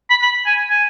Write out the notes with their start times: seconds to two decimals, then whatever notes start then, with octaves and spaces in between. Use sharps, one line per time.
0.10 B5
0.21 B5
0.46 G#5
0.69 G#5